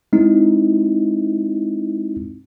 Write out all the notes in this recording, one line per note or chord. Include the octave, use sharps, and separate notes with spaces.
G#3 C4 D#4 E4